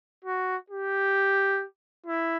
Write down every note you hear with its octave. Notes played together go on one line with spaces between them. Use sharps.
F#4
G4
E4